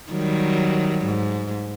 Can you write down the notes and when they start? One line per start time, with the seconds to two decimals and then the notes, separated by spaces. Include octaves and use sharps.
0.12 D#3 F#3 G3
1.05 G#2